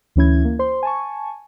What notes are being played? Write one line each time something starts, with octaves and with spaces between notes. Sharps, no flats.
D2 E3 C#4 E4 G#6
A#3
C5 C6
G#5 A5 C#6